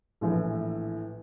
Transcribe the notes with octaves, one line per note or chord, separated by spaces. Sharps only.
A#1 A2 E3